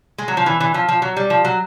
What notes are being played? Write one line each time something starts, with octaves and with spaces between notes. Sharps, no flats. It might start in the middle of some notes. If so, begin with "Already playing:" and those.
G#3
F#3
F3
E3
E3
F3
F3
F#3
G3
F3
F#3